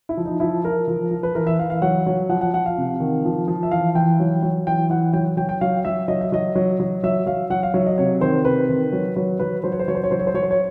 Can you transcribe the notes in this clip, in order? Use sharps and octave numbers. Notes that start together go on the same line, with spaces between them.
E4
F3
D#4
F3 E4
F3 A#4
F3
F3
B4
E3 A#4
E5
E3 F5
F5
F#3 F#5
F#3
F3 F#5
F#5
F3 F#5
F5
C3
D#3
F3
F3
E5
E3 F5
E3 G5
F#3
F#3
E3 G5
E3 F#5
F#3 G5
F#3 G5
G5
F#3 F5
F#3 E5
F#3 D#5
E5
F#3 D#5
F#3
F#3
F#3 E5
F#3 F5
F#3 F#5
F5
F#3 E5
D#5
C3 C#5
D#3 C5
C3 B4
D#3
F#3
F#3
F#3 B4
F#3 C5
C#5
C5
F#3 C#5
C5
C#5
F#3 C5
C#5
C5
F#3 C#5
C5
C#5